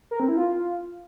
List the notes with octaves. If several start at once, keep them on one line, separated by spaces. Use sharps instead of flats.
A#4
C4
E4
F4